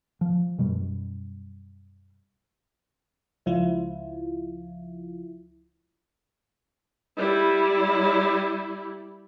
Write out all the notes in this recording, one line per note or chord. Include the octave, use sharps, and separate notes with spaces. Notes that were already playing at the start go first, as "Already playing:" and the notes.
F3
F#2 B2 G3
C#2 F3 E4 F4
G3 E4